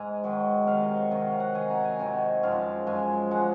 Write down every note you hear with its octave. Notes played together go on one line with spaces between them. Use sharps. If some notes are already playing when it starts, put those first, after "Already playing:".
Already playing: G#2 G#5 A#5
G#2 D#3 F#3
C3 D#3 F#3 F5
D#5
C#5
C3 D#3 F#3 D#5
F5
F#5
C3 D#3 F#3 G#5
A#5
G#5
C3 D#3 F#3
F#2 F3 G#3 F5
F#2 F3 G#3 G#5
F3 G#3 F#5